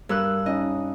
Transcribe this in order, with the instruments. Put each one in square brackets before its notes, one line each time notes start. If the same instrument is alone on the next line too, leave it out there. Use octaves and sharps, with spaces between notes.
[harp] G2 E6 F#6 [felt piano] A#4
[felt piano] C#4 D#4 [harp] D#5